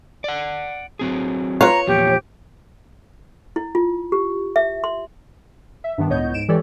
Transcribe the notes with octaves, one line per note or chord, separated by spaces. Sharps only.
D5 F#5
F#3 C4 G#4
F4 B4 C#5 F5 A#5
E2 A#2 F3 G4
E4
F4
G4
E5
C6
E5
G2 D#3 B3 D4
C#2 A2 B3 C#5 D#5 G6
G#2 D7 E7
E3 G#3 G4 A4 C#5 D5